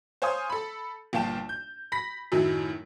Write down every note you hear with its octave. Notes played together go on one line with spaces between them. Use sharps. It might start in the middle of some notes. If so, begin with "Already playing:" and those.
C5 C#5 F5 G#5 C6 D#6
A4 B5
G1 A#2 F5 G5 A5 E7
G6
B5 A#6 B6
F#2 A2 D#3 F#3 E4